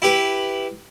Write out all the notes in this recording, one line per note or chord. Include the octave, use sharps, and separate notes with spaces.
E4 G4 B4